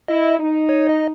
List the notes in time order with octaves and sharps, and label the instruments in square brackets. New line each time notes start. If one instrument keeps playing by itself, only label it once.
[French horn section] E4 [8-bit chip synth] D#5
[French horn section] D#4
[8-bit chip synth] C#5
D#5